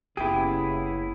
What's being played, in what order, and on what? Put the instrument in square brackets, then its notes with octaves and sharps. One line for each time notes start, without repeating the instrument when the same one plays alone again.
[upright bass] F#1 [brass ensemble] C#3 [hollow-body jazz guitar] B3 G4 [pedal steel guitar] E4 G#4